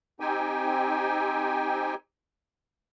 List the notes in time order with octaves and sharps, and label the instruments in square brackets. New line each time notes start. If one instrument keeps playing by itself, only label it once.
[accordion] C4 D#4 G4 G5 G#5